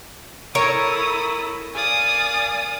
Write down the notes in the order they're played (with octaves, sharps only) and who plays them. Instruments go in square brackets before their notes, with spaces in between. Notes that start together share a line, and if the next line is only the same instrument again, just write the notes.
[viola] E4 A4 [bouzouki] A#4 C#5 [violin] D#6
[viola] D5 F5 [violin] G#5 D#6